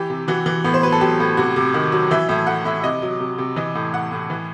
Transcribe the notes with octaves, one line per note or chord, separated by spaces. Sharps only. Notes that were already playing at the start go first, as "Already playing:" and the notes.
Already playing: E3 G4
C3
E3 F#4
E3
A2 B3
C5
F#3 B4
A4
F#3 G4
A2
C3 F#4
C3
D#3
F#3
E3 E5
A2 E5
A2 F#5
A2 E5
E5
C3 D#5
F#3
C3
C3
E3 D#5
A2
A2 F#5
A2
E3